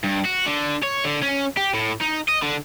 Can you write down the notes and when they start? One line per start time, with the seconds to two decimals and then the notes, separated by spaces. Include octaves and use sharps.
0.04 G2
0.25 F#4
0.46 D3
0.83 C#5
1.05 D3
1.23 C#4
1.57 G4
1.74 A2
2.01 D#4
2.29 D#5
2.43 D3